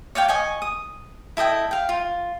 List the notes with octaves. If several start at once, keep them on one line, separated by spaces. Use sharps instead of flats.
C#5 D5 F5 G5
D#5 G#5 C#6
D#6
E4 A4 D#5 G5
F5 G5
F4